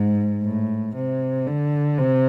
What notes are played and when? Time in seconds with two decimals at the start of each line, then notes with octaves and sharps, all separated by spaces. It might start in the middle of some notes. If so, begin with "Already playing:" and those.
Already playing: G#2
0.44 A2
0.96 C3
1.47 D3
1.98 C3